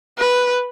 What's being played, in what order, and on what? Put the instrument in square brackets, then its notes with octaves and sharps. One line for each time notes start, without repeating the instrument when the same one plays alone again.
[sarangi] B4